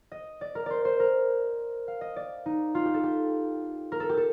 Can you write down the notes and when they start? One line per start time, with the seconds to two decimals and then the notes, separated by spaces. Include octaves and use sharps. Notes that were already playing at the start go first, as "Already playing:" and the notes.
0.12 D#5
0.41 D5
0.55 A#4
0.66 C5 D5
0.85 C5
1.00 A#4
1.88 F5
2.01 D#5
2.16 D5
2.46 D#4
2.75 F4
2.85 G4
2.94 A4
3.03 G4
3.92 A#4
4.00 A4
4.09 G4
4.17 A4